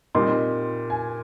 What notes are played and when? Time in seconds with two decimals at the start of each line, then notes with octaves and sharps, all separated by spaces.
0.15 A#2 G3 C4 D#4 C6
0.90 G#5